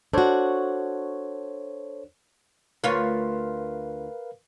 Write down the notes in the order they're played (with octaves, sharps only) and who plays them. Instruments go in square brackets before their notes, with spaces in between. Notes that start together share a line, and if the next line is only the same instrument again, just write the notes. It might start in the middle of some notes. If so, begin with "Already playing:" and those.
[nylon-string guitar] D4 F#4 [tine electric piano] A4 C5 C#5
[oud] D2 F4 C#5 [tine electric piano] A#4 B4 F5